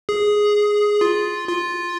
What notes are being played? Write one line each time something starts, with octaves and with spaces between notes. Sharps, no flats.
G#4
F4
F4